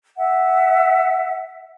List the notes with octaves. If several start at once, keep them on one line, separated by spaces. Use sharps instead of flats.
E5 F#5